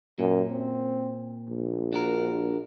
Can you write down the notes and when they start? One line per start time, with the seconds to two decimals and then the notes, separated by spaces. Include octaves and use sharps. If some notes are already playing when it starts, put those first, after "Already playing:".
0.19 F#2 A#2
0.51 C4
1.49 A#1
1.93 D4 F#4 A#4